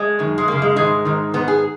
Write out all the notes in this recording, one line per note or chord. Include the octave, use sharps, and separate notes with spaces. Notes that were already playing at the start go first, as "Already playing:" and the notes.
Already playing: G#3
F#2 D#3
G#3
F#2 C#3 A#3
G#3
G#2 D#3 G#3
G#2 D#3
G#2 D#3 B3
G#4